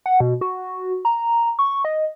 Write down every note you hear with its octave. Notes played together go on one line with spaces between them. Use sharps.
F#5
B2
F#4
A#5
C#6
D#5